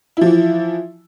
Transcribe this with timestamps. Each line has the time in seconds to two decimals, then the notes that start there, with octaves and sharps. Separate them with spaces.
0.17 E4
0.21 F3
0.26 E3